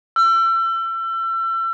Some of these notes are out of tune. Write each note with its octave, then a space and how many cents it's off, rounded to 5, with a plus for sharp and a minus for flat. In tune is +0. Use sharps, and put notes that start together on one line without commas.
E6 +35